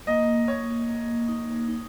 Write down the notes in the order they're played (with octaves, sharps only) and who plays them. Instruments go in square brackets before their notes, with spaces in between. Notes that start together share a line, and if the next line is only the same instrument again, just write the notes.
[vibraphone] A#3 [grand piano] D#5
[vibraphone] A#3 [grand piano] C#5
[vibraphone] A#3
D#4
D#4